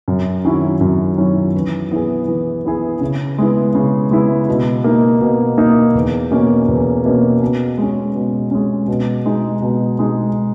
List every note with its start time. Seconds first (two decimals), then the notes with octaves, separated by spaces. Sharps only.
0.08 F#2
0.45 D#3 F#3 C#4 E4
0.81 F#2
1.17 D#3 F#3 C#4 E4
1.55 E3
1.91 B3 E4 G#4
2.28 E3
2.65 B3 E4 G#4
3.01 C#3
3.38 G#3 B3 E4
3.75 C#3
4.11 G#3 B3 E4
4.49 B2
4.84 A#3 D#4
5.21 B2
5.58 A#3 D#4
5.95 E2
6.31 B2 A#3 C#4
6.68 E2
7.05 B2 A#3 C#4
7.42 B2
7.78 G#3 C#4
8.15 B2
8.51 G#3 C#4
8.88 B2
9.26 G#3 D#4
9.62 B2
9.99 G#3 D#4